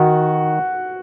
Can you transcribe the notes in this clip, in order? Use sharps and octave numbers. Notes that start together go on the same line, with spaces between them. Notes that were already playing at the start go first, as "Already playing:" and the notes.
Already playing: D#3 F#4